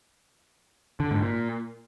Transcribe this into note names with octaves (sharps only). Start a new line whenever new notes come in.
D3
G#2
A#2